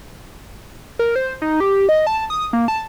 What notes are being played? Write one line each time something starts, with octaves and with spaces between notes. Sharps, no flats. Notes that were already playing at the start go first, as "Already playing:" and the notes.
A#4
C5
D#4
G4
D#5
A5
D#6
A#3
A5